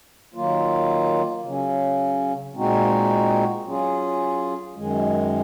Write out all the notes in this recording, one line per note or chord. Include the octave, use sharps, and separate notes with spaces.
D#3 F#3 A#3 F4
C#3 F#3 C#4
A#2 G#3 C4 D#4 F#4
F#3 C#4 F4 G#4
F#2 D#3 G#3